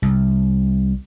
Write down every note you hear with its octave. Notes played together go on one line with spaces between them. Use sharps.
C2